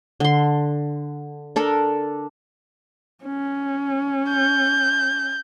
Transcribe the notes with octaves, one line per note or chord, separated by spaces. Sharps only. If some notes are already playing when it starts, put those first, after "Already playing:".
D3 C6
D4 A4 A#4
C#4
G6